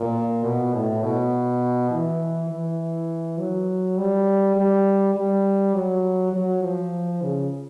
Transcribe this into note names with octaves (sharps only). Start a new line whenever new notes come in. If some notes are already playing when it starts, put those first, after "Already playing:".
Already playing: A#2
B2
A2
B2
E3
E3
F#3
G3
G3
G3
F#3
F#3
F3
C#3